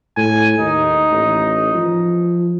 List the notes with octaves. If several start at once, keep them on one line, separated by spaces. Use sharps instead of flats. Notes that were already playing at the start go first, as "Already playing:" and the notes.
A2 G#5
D#2 D#4
A1
F3